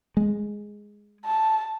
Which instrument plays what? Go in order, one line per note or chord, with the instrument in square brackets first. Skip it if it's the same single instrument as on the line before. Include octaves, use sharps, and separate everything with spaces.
[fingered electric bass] G#3
[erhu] A5